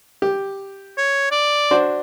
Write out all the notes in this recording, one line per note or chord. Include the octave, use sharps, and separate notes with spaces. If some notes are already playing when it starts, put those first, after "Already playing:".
G4
C#5
D5
D4 F#4 C5